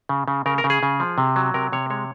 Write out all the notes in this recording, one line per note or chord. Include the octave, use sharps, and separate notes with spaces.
C#3
C#3
C#3 A#4
A#4
C#3
G#4
C#3
F3
C3
F#3
C3 A#4
C3 C#5
G#3 C#5